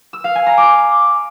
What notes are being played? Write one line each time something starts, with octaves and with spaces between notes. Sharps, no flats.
E6
F5
G#5
A#5
D6